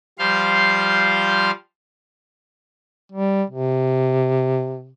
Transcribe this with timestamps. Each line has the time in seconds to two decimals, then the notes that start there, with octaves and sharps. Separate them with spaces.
0.19 F3 G3 C5 F5 C6
3.12 G3
3.50 C3